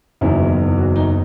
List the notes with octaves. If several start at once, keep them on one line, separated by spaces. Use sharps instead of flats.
F#1 E2 D#3 F#3 C#4 E4
F#4
D#4